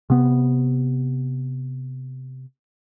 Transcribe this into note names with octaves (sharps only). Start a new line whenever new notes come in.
C3 B3